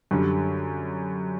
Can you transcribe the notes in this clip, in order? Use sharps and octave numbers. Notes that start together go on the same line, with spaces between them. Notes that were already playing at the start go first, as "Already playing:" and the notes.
F#2 D3 G3